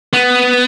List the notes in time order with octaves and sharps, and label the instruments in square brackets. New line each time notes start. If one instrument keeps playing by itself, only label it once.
[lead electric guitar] B3